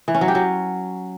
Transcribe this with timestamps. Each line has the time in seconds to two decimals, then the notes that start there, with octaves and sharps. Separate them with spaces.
0.08 E3
0.15 C#4
0.21 F#3
0.28 G4
0.35 F#3